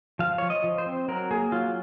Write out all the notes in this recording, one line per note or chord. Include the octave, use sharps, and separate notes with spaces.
F3 F5
F3 C#5
D#5
F3
C5
C4
F#3 A#4
A#3 G#4
F#3 F4